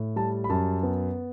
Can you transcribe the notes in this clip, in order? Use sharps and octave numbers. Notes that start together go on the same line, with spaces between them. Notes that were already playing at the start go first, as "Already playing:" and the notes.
Already playing: A2
G3 A5
B5
F#2 A5
B3